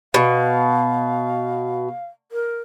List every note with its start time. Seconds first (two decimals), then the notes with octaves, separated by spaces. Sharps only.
0.14 B2 F5
2.32 A#4